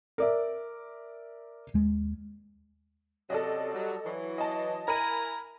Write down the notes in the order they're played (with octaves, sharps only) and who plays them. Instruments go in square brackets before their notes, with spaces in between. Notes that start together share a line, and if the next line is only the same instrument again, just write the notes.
[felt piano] A#4 D5 E5
[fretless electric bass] D#2 G#3
[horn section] C3 F#3 C#4 [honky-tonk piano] A4 D5 D#5
[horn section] F#3 G3
E3 F#3
[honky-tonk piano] D#5 A5
[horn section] E4 G#5 A#5 [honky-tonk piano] A#4 B5 D#7